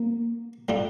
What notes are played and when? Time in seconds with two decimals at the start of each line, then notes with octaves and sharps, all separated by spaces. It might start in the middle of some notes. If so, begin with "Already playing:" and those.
Already playing: A#3
0.68 A2 G3 D4 F4